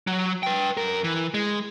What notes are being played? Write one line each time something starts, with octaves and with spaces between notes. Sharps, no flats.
F#3
B4 G5
F#2 A#4
E3
G#3